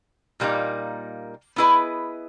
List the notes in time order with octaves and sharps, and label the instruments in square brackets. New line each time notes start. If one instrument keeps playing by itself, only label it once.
[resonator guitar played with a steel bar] A#2 G3 A#3 D#4
B3 E4 G#4 B4 D#5